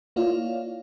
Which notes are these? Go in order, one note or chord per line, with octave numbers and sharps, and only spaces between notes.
A#3 E4 F4 C#5 D5 F5